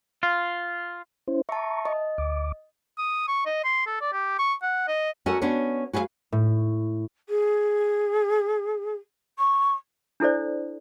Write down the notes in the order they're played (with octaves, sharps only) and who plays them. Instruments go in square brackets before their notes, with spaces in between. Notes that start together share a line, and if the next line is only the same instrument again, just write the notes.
[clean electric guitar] F4
[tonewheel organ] C#4 E4 C5
[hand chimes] E5 A5 [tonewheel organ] A#5 C#6
[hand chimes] D#5
[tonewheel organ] D2 D6
[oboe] D#6
C#6
D#5
C6
A4
D5
G4
C#6
F#5
D#5
[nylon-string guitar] C#4 F#4 A4 A#4 D#5
B3 C#4 D4 F#4 C#5
F#4 G#4 B4 D5 F5
[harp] A2
[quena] G#4
C#6
[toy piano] D4 E4 A4 C5 D5